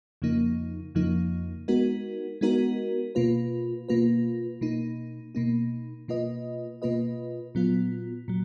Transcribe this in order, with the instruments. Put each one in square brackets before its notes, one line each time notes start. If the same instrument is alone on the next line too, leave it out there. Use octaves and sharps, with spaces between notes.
[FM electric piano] F2 C#3 F3 A#3 D#4
F2 C#3 F3 A#3 D#4
G#3 B3 D#4 F#4 A#4
G#3 B3 D#4 F#4 A#4
B2 A#3 F4 B4
B2 A#3 F4 B4
B2 A#3 D#4
B2 A#3 D#4
B2 A#3 F4 B4 D#5
B2 A#3 F4 B4 D#5
A#2 F#3 B3 F4
A#2 F#3